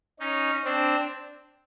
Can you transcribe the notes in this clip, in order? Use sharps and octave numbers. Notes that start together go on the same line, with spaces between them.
C#4 D#4
C4 D4